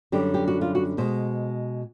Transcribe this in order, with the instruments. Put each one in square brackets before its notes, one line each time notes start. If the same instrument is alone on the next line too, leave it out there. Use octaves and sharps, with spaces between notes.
[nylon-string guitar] F#2 D3 G3 G4
G4
F#4
F4
F#4
B2 G#3 C5